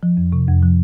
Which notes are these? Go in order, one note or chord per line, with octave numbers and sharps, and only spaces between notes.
F3
F2
C3
F2
F3